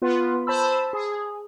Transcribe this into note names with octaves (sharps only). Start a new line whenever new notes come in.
B3 F4 B4
C5 A5 B5 E6
G#4